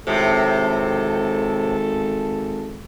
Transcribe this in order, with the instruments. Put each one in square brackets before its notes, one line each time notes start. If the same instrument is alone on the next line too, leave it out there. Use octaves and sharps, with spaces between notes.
[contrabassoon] G#1 [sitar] A2 C3 [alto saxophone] A4